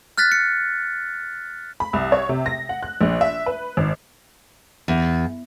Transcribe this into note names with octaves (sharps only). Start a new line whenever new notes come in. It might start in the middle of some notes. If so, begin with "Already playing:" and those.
F6 F#6 A6 B6
C#7
B5
C2
C#5
C3
A#6
F#5
F#6
A#1
E5
B4
G#1
E2